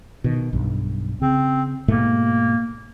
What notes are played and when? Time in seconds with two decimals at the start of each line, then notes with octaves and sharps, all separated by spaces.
0.24 B2 D#3
0.53 B1 G2
1.22 C#3 C4
1.88 G#2 B2 A3 A#3